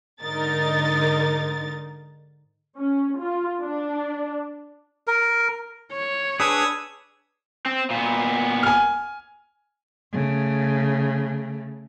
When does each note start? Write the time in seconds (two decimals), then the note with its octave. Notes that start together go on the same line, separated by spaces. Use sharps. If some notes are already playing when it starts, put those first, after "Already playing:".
0.22 G#2 D3 D#4 A#4 A6
2.78 C#4
3.21 F4
3.61 D4
5.07 A#4
5.92 C#5
6.40 D4 G#4 B4 D#6 E6 G#6
7.65 C4
7.90 A#2 B3
8.63 G#5 F6
10.12 C#3 A3